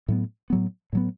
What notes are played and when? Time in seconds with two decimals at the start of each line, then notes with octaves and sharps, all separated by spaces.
0.08 A2 F#3 B3
0.50 A2 F#3 B3
0.93 A2 F#3 B3